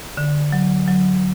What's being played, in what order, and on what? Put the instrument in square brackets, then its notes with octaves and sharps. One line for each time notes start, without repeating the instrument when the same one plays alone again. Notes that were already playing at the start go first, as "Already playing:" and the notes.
[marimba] D3
F#3
F#3